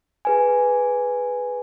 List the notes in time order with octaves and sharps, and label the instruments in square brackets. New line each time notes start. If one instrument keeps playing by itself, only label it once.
[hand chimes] G#4 B4 G#5